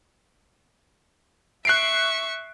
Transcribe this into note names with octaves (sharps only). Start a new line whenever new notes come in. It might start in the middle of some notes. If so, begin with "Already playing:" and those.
E5 C#6 F#6 C7 D7